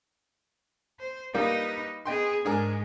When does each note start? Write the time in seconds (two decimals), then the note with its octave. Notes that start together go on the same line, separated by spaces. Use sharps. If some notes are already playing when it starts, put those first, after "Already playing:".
1.00 C5
1.34 G3 A#3 D#4 F4 B4
2.06 B3 G#4 D#5 G5 C6
2.45 G#2 G#3 D4 G#4 A#4